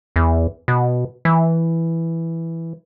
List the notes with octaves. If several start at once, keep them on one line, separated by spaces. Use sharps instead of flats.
E2
B2
E3